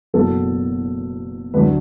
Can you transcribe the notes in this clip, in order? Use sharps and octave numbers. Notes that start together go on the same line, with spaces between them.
F#1 E2 B2 F#3 A4
D2 D3 F#3 A3 B4